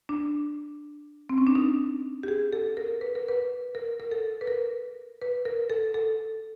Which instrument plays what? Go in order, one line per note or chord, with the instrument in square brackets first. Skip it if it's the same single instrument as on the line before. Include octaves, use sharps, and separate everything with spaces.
[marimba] D4
C4
C#4
D4
D#4
G4
G#4
A4
A#4
B4
A#4
B4
A#4
A#4
A4
B4
A#4
B4
A#4
A4
A4